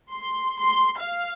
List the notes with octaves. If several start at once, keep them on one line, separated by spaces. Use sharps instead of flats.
C6
C6
F5